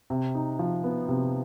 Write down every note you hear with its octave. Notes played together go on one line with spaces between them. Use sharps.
C3
D#4
F3
B3
C3